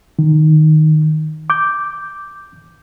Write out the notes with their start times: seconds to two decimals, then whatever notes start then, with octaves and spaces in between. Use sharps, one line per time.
0.19 D#3
1.50 D6 G6